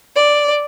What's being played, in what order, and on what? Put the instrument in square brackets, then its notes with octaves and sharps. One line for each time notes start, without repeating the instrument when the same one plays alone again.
[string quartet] D5